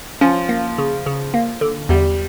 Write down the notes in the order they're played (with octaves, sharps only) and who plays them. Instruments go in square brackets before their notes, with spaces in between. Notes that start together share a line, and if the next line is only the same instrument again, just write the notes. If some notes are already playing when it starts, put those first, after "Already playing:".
[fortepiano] F3 [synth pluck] C#4
[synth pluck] A#3
C#3
C#3
A#3
D3
[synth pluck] E2 [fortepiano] G3